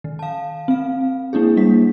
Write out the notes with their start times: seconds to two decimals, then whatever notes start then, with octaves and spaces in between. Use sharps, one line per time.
0.04 D#3
0.19 F5 A5
0.68 C4 F5
1.33 A#3 D4 E4 G#4
1.57 G3 A#3 D4 B6